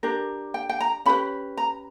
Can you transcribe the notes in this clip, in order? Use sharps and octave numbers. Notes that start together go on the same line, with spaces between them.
D4 G4 A#4
G5
G5
A#5
C#4 G4 B4 B5
A#5